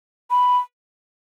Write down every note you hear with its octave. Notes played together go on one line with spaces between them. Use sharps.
B5